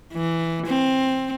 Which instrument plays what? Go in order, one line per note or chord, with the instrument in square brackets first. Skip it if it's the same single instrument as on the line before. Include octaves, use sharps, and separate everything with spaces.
[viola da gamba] E3
C4